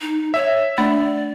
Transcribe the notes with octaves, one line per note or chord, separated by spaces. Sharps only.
D#4
C#5 E5
A3 D4 D5